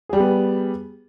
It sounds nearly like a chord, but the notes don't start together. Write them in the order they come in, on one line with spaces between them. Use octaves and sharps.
G#4 G3 G4 B3